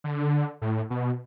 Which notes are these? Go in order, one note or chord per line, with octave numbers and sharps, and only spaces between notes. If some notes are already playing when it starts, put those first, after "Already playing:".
D3
A2
B2